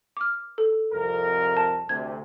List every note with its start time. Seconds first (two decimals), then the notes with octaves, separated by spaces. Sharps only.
0.17 D6 F6
0.58 A4
0.93 C2 F2 A#4
1.57 A5
1.89 D2 C3 G#6